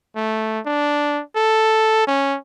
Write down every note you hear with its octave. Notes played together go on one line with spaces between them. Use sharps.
A3
D4
A4
C#4